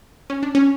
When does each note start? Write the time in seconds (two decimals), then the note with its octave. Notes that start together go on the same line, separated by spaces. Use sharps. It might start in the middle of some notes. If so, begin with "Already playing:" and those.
0.30 C#4
0.43 D4
0.55 C#4